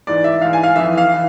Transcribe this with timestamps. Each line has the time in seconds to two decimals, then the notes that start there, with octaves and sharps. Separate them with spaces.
0.07 G#2 E3 D5
0.24 E5
0.41 G#2 E3 F5
0.53 G#5
0.63 F5
0.76 F2 E3 E5
0.98 F5
1.14 E3